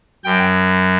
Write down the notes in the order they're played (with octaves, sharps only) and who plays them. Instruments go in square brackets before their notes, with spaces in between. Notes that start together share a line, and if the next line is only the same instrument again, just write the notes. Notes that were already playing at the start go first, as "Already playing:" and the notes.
[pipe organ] F#2 G5